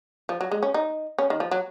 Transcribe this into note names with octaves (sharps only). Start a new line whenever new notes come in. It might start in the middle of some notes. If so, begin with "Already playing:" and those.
F3
F#3
G#3
C#4
D#4
C#4
D#3
F3
F#3